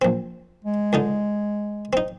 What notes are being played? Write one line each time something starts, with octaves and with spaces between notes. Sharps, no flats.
A#1 C4
G#3
C#2 D3 D#4
C4 D#4